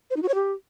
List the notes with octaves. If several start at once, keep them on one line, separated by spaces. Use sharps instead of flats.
C5
D#4
F#4
C#5
G4